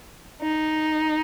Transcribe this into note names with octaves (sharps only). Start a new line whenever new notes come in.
D#4